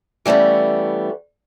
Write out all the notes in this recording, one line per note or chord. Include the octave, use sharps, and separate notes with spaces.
E3 G3 A3 B3 C#4